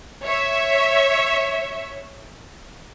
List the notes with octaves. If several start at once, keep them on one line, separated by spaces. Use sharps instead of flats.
C#5 E5